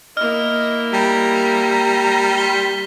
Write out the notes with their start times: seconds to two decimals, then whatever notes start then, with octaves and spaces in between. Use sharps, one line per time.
0.17 A#3 E4 D#5 F6
0.93 G3 A#5
2.38 C6 B6 G7